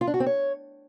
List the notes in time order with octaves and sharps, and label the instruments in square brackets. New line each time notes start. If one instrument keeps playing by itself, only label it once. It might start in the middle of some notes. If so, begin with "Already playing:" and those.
[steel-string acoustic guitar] F4
D4
F#4
C4
C#5